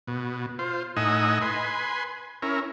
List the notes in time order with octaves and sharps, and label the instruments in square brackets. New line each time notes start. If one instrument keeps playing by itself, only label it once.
[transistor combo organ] B2
F4 C5
A2 D#4 D#5 F#5 G#5 E6
B4 G#5 C6
C#4 E4 A#4